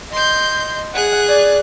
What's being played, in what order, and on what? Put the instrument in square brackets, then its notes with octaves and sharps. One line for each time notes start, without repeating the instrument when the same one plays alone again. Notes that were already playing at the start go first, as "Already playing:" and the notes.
[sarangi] D#5 [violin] C6 G6
[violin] G#4 F#6 [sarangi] F#5
[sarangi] D5